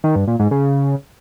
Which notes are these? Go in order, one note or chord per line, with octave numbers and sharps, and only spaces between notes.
D#3
G2
A#2
G#2
C#3